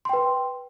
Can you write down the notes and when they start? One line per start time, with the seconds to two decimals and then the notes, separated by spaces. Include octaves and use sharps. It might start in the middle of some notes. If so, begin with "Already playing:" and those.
0.05 C6
0.09 G5
0.13 B4